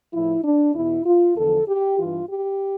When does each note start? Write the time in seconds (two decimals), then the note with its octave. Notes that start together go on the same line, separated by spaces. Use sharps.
0.14 A2 F3 E4
0.44 D4
0.75 E2 B2 E4
1.06 F4
1.36 E2 D3 F3 A4
1.68 G4
1.99 G2 E3 F4
2.30 G4